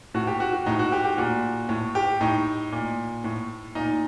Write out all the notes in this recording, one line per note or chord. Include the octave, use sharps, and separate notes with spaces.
A2 F#4
G4
F#4
F#4
A2 D#4
F#4
G4
G4
A#2 F#4
A2
G4
A2 D#4
A#2
A2
A#2 D#4